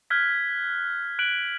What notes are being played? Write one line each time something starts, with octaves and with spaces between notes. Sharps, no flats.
F6 F#6 G#6 B6
F#6 D7 F#7